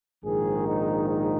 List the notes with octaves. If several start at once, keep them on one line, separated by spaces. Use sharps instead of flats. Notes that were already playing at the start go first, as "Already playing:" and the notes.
A#1 G#2 D#3 G#4
D#4
D#4